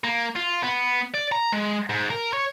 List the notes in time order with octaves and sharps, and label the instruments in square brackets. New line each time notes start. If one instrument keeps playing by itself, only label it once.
[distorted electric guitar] A#3
F4
B3
D5
A#5
G#3
G#2
A#4
C#5